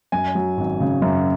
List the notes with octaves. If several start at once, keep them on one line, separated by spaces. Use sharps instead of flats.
F#2 G#5
F#3
G#1
C#3
F#2